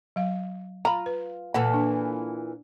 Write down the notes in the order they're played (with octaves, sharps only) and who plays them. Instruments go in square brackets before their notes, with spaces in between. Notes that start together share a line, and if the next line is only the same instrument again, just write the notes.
[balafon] F#3 F5
[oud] F4 [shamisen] A#5 B5
[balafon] B4
[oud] A#2 E3 A4 [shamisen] F#5
[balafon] D4